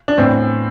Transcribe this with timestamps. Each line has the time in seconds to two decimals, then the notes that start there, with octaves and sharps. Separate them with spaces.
0.08 D4
0.18 A2 E3 B3 C4